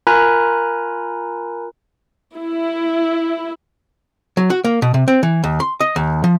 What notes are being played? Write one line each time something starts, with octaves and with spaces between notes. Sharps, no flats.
F4 A#4 G#5 A#5 B5 F#6
E4
F#3
F#4
A#3
B2
C3
C4
E3
D#2
C6
D#5
D#2
F3